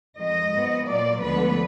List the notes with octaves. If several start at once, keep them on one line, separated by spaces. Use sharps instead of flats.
F2 D#3 G#3 D#5
G#2 F3 B3
A#2 F#3 A#3 D5
D2 D3 F3 G#3 B3 B4